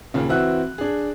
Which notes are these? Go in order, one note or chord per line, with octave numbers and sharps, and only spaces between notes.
D#2 A#2 C#3
E3 C4 F#4 E5 F#6
D4 G#4